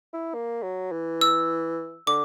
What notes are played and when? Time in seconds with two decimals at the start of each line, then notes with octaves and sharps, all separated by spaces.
0.13 E4
0.34 A#3
0.63 F#3
0.92 E3
1.21 E6
2.07 D3 D6